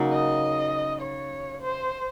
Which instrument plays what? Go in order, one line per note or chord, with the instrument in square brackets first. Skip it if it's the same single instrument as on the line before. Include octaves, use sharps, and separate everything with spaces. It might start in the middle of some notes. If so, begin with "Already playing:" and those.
Already playing: [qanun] C#3 F#3 A#3 D#4
[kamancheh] D#5
C#5
C5